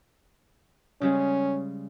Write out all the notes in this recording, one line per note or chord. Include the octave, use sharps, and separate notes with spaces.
C#3 G3 G#3 C#4